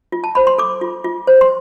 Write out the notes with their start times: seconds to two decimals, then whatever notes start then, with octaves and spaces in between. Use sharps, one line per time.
0.12 F4
0.24 A5
0.35 C5 B5
0.47 C6
0.58 A4 D6
0.81 F4
1.04 F4
1.27 C5
1.41 C6